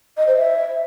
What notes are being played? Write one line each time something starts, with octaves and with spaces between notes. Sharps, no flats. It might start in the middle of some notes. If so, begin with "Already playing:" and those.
D#5
C5
E5